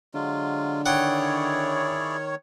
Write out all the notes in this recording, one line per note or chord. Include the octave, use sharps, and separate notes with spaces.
D3 F#3 G#3 F4
D#3 E4 G#4 C#5 D5 F#5 G5